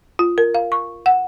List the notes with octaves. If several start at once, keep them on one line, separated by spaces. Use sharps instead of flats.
F4
A#4
F5
C#6
F#5